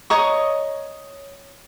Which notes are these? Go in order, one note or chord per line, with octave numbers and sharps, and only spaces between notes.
C#5 D#5 A#5 C#6